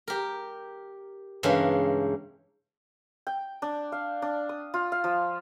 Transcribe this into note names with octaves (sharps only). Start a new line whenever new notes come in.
G4 A#4
G2 C#3 E3 G#3 A#3
G5
D4
F5
D4
D#6
F4
F5
F3